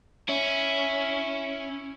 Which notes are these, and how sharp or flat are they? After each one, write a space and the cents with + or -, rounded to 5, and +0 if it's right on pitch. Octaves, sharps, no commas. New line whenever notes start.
C#4 +0 E4 +0